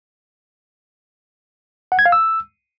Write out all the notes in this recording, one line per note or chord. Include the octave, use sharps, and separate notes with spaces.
F#5
G#6
F5
E6